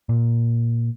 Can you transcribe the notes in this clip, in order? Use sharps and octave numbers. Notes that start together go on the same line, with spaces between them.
A#2